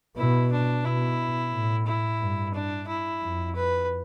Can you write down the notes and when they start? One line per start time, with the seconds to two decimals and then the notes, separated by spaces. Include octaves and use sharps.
0.17 B2 E4
0.52 D4
0.85 B2 E4
1.53 A2
1.86 E4
2.21 G2
2.54 D4
2.88 E4
3.23 F2
3.55 B4